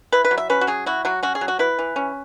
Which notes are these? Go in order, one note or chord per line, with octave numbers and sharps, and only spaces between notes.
E4 B4
B4
F#3
E5
C#4 B4
F#4
F#3 G#4
E4 F#4
F#3 F#4
C#4 F#4
G#4
F#3
F#4
E4 B4
E3
C#4